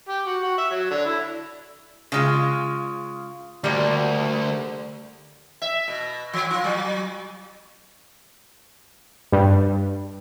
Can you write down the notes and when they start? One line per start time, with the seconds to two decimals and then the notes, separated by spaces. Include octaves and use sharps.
0.09 G4
0.27 F#4
0.43 F#4
0.58 E5
0.71 F#3
0.91 D3
1.05 E4
2.12 C#3 G#3 F4
3.64 D2 G3 A#3
5.62 E5
5.88 B2
6.33 F3
6.51 F4
6.64 F#3
9.32 G2